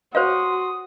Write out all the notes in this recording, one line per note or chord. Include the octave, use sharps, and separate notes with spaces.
F#4 C5 C#5 F5 C6 D#6